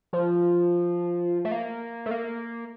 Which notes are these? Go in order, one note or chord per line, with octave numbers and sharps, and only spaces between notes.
F3
A3
A#3
A3
A#3